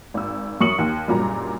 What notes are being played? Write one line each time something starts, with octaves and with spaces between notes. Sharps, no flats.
G#1 E6
F#2 C#6 D#6 C#7 F#7
D#2
F#1 G2 A#2 F#3 A#5